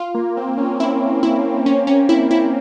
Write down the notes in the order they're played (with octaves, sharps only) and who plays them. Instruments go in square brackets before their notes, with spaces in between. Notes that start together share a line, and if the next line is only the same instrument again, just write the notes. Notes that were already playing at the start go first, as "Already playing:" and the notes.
Already playing: [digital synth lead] F4
[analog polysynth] A#3
C4
C#4
[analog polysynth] C4 [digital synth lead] E4
[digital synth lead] E4
C#4
C#4
E4
E4